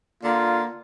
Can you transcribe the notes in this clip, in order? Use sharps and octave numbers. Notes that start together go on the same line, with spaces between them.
D3 A#3 F4